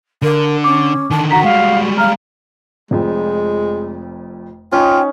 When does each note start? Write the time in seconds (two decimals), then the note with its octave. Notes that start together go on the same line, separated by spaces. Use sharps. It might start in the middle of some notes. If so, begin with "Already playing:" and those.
0.22 D3 A#4
0.64 C#4 D6
1.10 D3 D#3 A5
1.31 F#4 F#5 A#5 B6
1.44 G3 G#3 F5
1.98 F5 A#5 F6
2.91 F1 F2 G#3
4.72 C#4 D#4 F4 G5